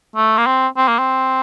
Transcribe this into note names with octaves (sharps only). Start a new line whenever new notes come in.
A3
A#3
C4
C4
A#3
C4